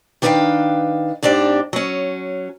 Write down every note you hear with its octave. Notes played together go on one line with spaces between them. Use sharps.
D#3 D4 B4 D#5 F5 G5
G#2 C4 D4 G4 D5
F#3 C#4